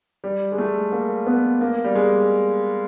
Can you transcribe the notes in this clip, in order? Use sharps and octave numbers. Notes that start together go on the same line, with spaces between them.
G3
G#3
A3
A#3
B3
A#3
G3
G#3